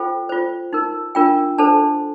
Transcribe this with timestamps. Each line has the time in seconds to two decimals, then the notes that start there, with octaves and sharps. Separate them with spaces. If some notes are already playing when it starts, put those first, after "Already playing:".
Already playing: F4 A4 C5 G5
0.29 F4 C5
0.73 D#4 A#4
1.15 D4 F4 A#4 G5
1.58 D4 A4 C5 A5